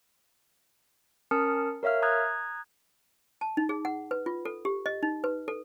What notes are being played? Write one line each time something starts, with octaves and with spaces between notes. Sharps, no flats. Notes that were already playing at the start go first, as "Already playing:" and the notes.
C#4 A#4 A5 D#6 F6 C#7
A#4 C#5 E5 F5 F6
A#5 D#6 F#6 G#6
A5
D#4
G#4
F#5
B4
F4
A4
G4
D#5
D#4
B4
A4